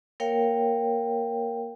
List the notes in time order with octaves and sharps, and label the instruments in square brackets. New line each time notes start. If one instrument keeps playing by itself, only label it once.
[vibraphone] A#3 A#4 C#5 F5 G5